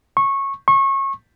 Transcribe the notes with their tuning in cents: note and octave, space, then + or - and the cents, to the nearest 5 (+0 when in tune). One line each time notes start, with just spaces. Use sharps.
C#6 -15
C#6 -25